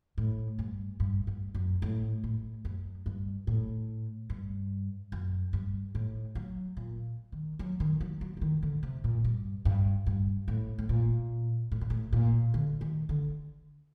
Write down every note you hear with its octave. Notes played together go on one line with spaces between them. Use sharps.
A2
G2
G2
G2
F#2
A2
A2
F#2
G2
A2
G2
F#2
G2
A2
F#3
A#2
D#3
F#3
D#3
F#3
F#3
F#3
D#3
D3
C3
A#2
G2
G2
G2
A2
A2
A#2
A2
A#2
A2
A#2
D3
D#3
D3